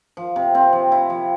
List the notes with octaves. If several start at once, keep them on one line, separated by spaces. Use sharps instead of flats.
F3
C3
C4
F3
E4
F3